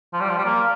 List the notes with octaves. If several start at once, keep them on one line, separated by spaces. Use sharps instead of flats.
F3
G3
F3
G3
A#3